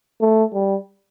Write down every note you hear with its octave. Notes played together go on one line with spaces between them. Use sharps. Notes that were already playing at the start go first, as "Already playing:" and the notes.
A3
G3